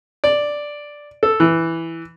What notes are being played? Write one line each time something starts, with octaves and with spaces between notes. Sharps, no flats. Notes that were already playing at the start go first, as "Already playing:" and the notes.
D5
A4
E3